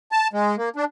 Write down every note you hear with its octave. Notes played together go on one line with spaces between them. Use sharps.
A5
G#3
A#3
D4